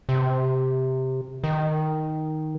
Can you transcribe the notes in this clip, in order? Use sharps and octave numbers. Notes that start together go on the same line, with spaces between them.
C3
D#3